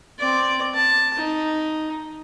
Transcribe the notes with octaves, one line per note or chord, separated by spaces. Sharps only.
C4 D5
A5
D#4